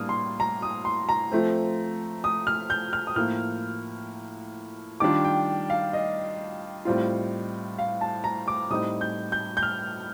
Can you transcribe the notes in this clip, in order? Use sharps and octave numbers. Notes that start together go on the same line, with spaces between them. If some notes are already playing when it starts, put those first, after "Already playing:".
Already playing: A2 G3 A#3 D4 D#6 F6
C6
A#5
D#6
C6
A#5
F3 A3 C4
D#6
F6
G6
F6
D#6
A2 F3 A#3 F6
D#3 G3 D4 F4 D6
G5
F5
D#5
A2 G3 C4 F4
F5
A5
A#5
D6
A2 G3 C4 D#4 D#6
G6
G6
G6
F6